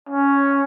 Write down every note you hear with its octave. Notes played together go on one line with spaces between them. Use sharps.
C#4